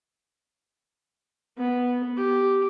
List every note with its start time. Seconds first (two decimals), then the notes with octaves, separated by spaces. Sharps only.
1.58 B3
2.17 G4